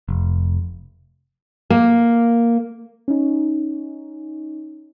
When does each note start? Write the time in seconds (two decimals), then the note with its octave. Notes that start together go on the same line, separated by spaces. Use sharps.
0.09 F1
1.70 A#3
3.08 C#4 D#4